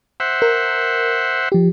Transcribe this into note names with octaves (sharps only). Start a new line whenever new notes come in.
C5 E5 F#5
A#4
F3 G4